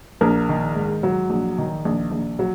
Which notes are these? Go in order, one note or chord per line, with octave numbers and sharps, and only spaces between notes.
A#1 A#4
D#3
G#2
F#3
A#1
D#3
A#1
A#1
F#3